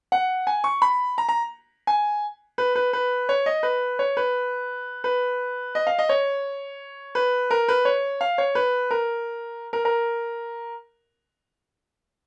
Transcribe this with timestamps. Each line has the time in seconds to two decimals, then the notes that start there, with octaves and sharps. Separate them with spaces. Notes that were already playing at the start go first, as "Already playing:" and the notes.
0.12 F#5
0.47 G#5
0.64 C#6
0.82 B5
1.18 A#5
1.29 A#5
1.87 G#5
2.58 B4
2.75 B4
2.93 B4
3.29 C#5
3.46 D#5
3.63 B4
3.99 C#5
4.17 B4
5.04 B4
5.75 D#5
5.87 F5
5.99 D#5
6.09 C#5
7.15 B4
7.51 A#4
7.68 B4
7.85 C#5
8.21 F5
8.38 C#5
8.55 B4
8.91 A#4
9.73 A#4
9.85 A#4